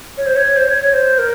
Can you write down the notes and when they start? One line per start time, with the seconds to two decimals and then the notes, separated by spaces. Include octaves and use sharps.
0.17 C#5
0.26 C5
0.36 C#5
0.57 C5
0.68 C#5
0.93 C5
1.19 A#4